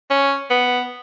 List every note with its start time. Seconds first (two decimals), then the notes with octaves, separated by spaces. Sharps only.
0.10 C#4
0.50 B3